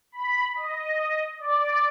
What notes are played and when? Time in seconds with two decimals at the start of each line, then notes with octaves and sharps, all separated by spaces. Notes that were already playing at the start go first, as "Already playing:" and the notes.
0.12 B5
0.55 D#5
1.39 D5